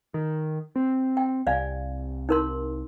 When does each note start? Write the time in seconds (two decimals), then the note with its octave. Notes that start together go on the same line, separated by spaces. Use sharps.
0.14 D#3
0.76 C4
1.17 G5
1.47 C2 D5 F5 G#5
2.29 D#4 A#4 C6